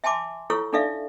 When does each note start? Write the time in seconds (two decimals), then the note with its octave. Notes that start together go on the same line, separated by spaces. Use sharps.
0.04 E5 G#5 A5 C6 D6
0.50 E4 F4 A4 C#5 C#6 E6
0.73 D4 D#4 A4 D5 E5 F5